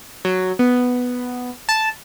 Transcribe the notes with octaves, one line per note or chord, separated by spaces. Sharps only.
F#3
B3
A5